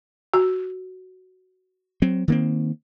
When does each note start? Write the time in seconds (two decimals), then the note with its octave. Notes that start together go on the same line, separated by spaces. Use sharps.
0.34 F#4
2.02 F#3 C4
2.28 D#3 A#3 C4